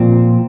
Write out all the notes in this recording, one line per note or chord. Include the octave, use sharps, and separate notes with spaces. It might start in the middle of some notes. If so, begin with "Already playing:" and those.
Already playing: A#2 F3 C4